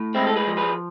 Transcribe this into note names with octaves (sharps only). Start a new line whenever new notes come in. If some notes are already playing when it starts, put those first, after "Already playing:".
Already playing: A2
G#3 C4 E4
A4
G#4 B4
F3
G#4 B4